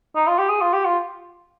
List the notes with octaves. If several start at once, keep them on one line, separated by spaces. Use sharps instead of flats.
D#4
F4
G4
G#4
F4
G4
F4